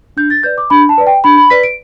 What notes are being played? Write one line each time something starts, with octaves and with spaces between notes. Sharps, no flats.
D4 G6
A6
B4 D5 G6
D6
D4 B5
A5
B4 D5
G5
D4 B5
B5
B4 D5 B6
D7